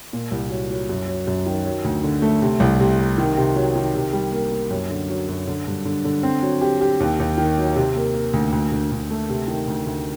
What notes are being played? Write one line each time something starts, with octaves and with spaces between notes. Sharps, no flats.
A#2
C2
F#3
F#3
F#2
F#3
F#2
D#3
F#3
D2
D3
A3
C3
C2
C3
C3
D#3
C3
F#3
D#3
C3
G3
A#3
A#3
F#2
D3
F#3
F#2
D3
G2
D3
D3
C4
F#3
G4
G4
D#2
D#2
D#3
F#3
C3
A#3
A#3
D2
D2
D2
D2
A3
C3
D#3
D2
D2